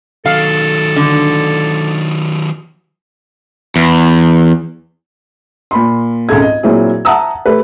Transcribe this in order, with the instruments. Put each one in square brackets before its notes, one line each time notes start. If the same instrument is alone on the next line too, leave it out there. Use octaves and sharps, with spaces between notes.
[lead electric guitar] D#3 F#3 [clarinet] A4 [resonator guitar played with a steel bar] F5
[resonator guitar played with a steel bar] D3
[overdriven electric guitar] E2
[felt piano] A#2 B5 C6
G#1 C#2 G#2 A4 G#6
D#5
A#2 F#3 C4 E4 G#4
E5 F#5 A5 A#5 D#6 E6
A3 G4 B4